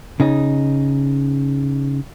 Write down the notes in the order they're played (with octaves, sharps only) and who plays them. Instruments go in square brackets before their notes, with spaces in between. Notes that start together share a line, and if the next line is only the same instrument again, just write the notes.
[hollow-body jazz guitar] C#3 D#4